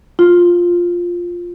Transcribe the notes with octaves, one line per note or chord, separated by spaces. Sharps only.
F4